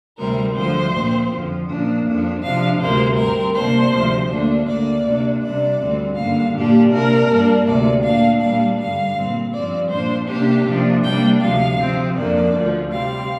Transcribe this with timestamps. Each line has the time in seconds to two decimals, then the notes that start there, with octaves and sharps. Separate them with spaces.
0.18 D2 C3 G3 C4 A#4
0.56 D2 D3 F3 C5
0.94 A#2 F3 C4
1.31 F2 D3 F3
1.69 A#2 F3 A#3 D4
2.05 F2 F3 D4
2.43 C3 F3 D4 F5
2.80 D2 C3 G3 A#3 C5
3.18 G2 G3 C4 A#4
3.56 C3 A#3 D4 C5
3.93 D2 C3 F3
4.30 D2 D3 A#3 D4
4.68 D2 D3 A#3 D5
5.05 C3 A#3 D4
5.43 C3 G3 D4 D5
5.81 D2 D3 G3 C4
6.17 G2 D3 A#3 D4 F5
6.55 A#2 A#3 D4 G4
6.92 C3 A#3 D4 A#4
7.29 G2 G3 A#3 D4
7.67 D2 C3 A#3 D5
8.04 A#2 A#3 D4 F5
8.42 A#2 G3 A#3 D4 F5
8.79 G2 D3 G3 F5
9.17 A#2 G3 C4
9.54 G2 F3 C4 D5
9.91 A#2 F3 D4 C5
10.29 C3 A#3 D4 G4
10.66 C3 F3 A#3 D4
11.03 C3 G3 A#3 D4 G5
11.41 D2 C3 F3 F5
11.79 C3 F3 C4
12.16 F2 F3 A#3 D4 D5
12.54 D2 D3 F3
12.91 C3 G3 C4 F5